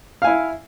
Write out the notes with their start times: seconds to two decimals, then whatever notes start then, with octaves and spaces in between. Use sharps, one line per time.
0.22 F5
0.24 G#5
0.27 E4